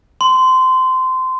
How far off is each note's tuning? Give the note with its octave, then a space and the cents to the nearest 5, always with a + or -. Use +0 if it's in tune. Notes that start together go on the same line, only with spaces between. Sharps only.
C6 -20